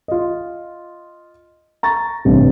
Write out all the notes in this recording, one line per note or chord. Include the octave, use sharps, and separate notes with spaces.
F4 D#5
A#5 C#6 A6
A1 G2 C3